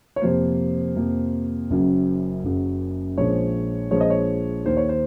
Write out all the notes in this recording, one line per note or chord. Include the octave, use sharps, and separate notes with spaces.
C#5
F2 C3 F3 A#3 C5
F2 C3 F3 A#3
F#1 F#2 C#3 F#3
F#1 F#2 C#3 F#3
A#1 A#2 F3 G#3 C#5
A#1 A#2 F3 G#3 C#5
D#5
C#5
D#2 D#3 A#3 C5
C#5
C5